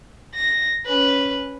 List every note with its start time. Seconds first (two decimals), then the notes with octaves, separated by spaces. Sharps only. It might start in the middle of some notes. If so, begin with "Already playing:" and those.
0.34 A#6
0.86 C#4 B4